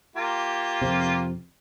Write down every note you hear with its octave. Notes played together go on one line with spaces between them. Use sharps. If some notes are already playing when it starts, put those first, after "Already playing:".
A#3 F4 G4
F2 C3